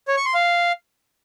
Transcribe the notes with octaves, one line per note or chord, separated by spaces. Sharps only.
C#5
C#6
C6
F5